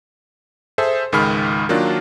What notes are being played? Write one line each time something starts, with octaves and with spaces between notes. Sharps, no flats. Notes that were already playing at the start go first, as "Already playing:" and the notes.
G#4 A4 C5 E5
C#2 G#2 D#3 G#4 B5 F6
D#3 F#3 A#3 D4 F4